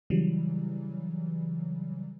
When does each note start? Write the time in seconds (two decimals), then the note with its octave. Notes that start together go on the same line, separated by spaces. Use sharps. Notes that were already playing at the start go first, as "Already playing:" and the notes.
0.10 C#3 E3 F#3 G3